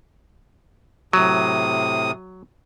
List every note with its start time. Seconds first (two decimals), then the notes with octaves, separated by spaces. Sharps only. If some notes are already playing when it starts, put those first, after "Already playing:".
1.13 A2 C3 F#3 D#6